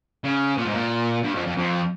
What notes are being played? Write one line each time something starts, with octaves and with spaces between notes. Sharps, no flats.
C#3
A#2
G#2
A#2
G2
F2
F2
F2